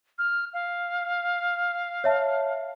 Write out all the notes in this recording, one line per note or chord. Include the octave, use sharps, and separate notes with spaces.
F6
F5
C#5 E5 A5